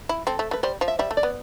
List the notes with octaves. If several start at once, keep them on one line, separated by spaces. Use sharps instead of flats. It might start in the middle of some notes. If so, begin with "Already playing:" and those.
E4
C4 A4
A3
A3 B4
G3 C5
F3
E5
G3 E5
A3
D5
B3